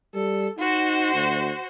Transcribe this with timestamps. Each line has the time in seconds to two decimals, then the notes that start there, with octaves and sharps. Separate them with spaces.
0.15 G3 A4
0.58 D#4 F#4 C5
1.14 D2